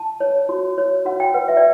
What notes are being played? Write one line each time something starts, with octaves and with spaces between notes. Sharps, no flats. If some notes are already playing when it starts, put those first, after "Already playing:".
Already playing: A5
C#5
F#4
C#5
F#4 F#5
G5
B4 F#5
E5
D5